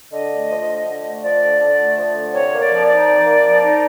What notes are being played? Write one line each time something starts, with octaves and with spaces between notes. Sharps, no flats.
D3 D#5
A3
F3
D3
D3
A3
F3 D5
D3
D3
A3
F3
D3
C3 C#5
A#3
D5
F3
D#4 D5
C3
A#3
F3
D#4